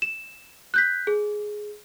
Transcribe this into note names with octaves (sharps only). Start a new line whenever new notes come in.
E7
F#6 G6 B6
G#4